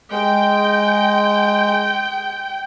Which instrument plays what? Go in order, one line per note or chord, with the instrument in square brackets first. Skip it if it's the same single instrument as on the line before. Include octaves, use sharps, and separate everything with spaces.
[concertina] G#3 [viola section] G5